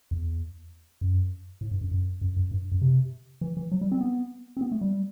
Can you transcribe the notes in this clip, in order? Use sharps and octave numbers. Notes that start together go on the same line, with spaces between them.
E2
F#2
A2
G2
F#2
F#2
F#2
F#2
G2
F#2
C3
E3
E3
F#3
G3
C4
B3
C4
B3
A3
G3